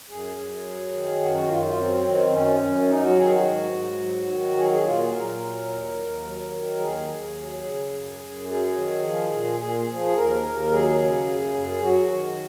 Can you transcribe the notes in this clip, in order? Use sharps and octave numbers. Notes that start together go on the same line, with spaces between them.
F#2 G#4
F#2
F#3
D#3
F#2 F#4
F#4
F#2 F4
F4
F#3 C4
D#3 C4
F#2 C#4
F#2
F#3 D#4
F#4
D#3 G#4
F#4
G#2
G#2
F#3
D#3
F#3 G#4
F#4
G#4
A#2 F4
G#4
A#2 A#4
F#3
D#2
D#2
F#3
D#3
D#2 G#4
D#2
F#3
C#3
F#2
F#2
F#3 G#4
D#3
F3
A#2
A#2 G#4
F3
D#2 A#4
D#2
F#3 G#4
C#3
F#2
F#2
F#3 F#4
D#3